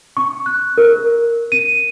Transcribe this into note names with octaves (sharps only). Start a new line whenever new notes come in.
C#6
F#6
A#4
D#7